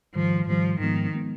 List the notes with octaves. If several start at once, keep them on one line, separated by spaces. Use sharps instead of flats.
G#2 D#3 F3 G3
G#2 D#3 F3 G3
G#2 D#3 F3 G#3 B3
F3 G#3 B3